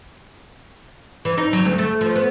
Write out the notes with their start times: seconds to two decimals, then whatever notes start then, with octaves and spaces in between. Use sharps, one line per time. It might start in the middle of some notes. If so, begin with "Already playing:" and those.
1.25 E3
1.38 D#4
1.53 F#3
1.65 D2
1.78 A3
2.01 F3
2.16 B3